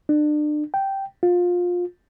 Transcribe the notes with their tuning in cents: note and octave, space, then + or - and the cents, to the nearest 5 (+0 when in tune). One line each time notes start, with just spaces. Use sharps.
D4 +35
G5 -10
F4 +20